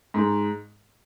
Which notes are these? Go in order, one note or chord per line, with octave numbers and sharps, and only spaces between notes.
G#2